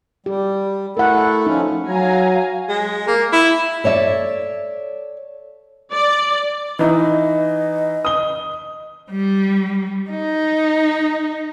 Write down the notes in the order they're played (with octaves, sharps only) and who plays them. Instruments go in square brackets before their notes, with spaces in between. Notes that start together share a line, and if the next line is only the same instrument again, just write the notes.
[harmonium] G3 [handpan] G4
[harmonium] A3 E4 A4 [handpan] A#4 F#5
[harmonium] F3 C#4 [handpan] D#4
[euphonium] F#3 [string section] F5 G#5 A#5
[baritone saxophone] G#3
A#3
E4
[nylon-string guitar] A4 C#5 D5 E5
[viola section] D5
[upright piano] E3 D#4 E4 [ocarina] D#5
[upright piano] D#6 G7
[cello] G3
D#4